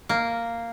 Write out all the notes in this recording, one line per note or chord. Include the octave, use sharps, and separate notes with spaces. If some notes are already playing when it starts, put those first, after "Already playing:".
A#3